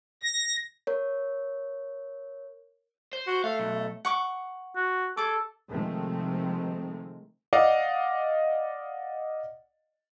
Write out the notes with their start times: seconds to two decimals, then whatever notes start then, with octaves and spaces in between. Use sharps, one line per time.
0.23 A#6
0.87 A#4 C#5
3.13 C5
3.27 F#4
3.44 A3 F5
3.59 B1
4.05 F#5 C#6 D6
4.76 F#4
5.17 G#4 A4 D6
5.69 C3 D#3 F3 G#3 A3 C4
7.53 D5 D#5 F5 F#5